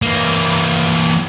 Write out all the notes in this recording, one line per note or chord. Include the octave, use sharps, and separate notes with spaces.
E3 A#3